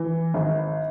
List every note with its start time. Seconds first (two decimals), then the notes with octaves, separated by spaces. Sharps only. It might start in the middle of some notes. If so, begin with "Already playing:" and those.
Already playing: E3
0.34 G#1